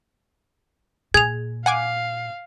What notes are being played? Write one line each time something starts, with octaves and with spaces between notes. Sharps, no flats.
A#2 G#4 G#6 F7
F5 F#5 G#5 D6